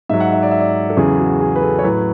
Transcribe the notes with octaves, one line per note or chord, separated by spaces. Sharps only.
G#2 F#3 E5
F#5
E5
D5
E5
D5
A4
E2 C#3 F#3 G#4
F#4
G#4
B4
A4
C#5
A2 F#3 B4